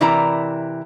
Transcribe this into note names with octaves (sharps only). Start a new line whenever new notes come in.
C3 E3 E4 A#4 D5 A#5